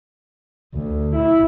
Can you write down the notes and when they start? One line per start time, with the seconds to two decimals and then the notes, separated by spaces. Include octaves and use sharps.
0.75 D2
1.16 E4